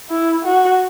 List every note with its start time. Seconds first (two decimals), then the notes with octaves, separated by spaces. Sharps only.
0.10 E4
0.45 F#4